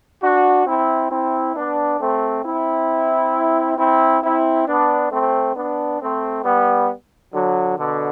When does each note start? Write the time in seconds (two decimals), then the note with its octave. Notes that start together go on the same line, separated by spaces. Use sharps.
0.23 D4 F#4
0.67 C4 E4
1.11 C4 E4
1.56 B3 D4
2.00 A3 C4
2.44 C4 E4
3.78 C4 E4
4.23 C4 E4
4.67 B3 D4
5.11 A3 C4
5.56 B3 D4
6.00 A3 C4
6.44 G3 B3
7.33 D3 F#3
7.78 B2 D3